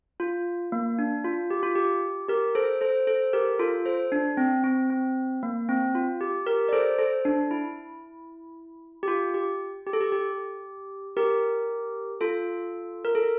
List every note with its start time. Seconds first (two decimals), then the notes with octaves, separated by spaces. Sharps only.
0.20 F4
0.72 A#3
0.99 D4
1.24 F4
1.50 G4
1.63 F4
1.75 G4
2.29 G4 A#4
2.55 A4 C5
2.81 A4 C5
3.07 A4 C5
3.33 G4 A#4
3.59 F4 A4
3.85 A4 C5
4.12 D4
4.37 C4
4.64 C4
4.90 C4
5.43 A#3
5.69 C4
5.95 F4
6.21 G4
6.47 G4 A#4
6.69 D5
6.73 A4 C5
6.98 A4 C5
7.25 D4
7.51 E4
9.03 G4
9.08 F4
9.34 G4
9.87 G4
9.93 A4
10.01 G4
10.12 G4
11.17 G4 A#4
12.21 F4 A4
13.05 A#4
13.15 A4